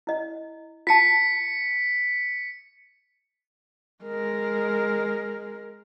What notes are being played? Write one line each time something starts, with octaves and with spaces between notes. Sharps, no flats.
E4 D#5
F4 A5 B6 C#7
G#3 A#4